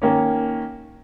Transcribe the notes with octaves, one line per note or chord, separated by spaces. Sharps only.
D#3 A#3 C#4